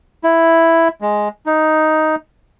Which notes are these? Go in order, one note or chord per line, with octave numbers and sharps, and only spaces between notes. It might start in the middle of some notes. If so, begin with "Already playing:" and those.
E4
G#3
D#4